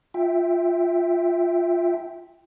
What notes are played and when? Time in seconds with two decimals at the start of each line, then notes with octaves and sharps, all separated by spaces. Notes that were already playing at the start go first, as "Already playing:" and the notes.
0.14 F4 E5 G5